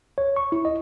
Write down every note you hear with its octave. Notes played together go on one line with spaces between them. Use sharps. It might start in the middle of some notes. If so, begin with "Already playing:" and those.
C#5
C#6
E4
D#5